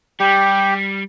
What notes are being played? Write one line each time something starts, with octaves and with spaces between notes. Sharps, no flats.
G3 G4